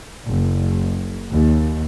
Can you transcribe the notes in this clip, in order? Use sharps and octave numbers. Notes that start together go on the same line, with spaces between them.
F#1
D#2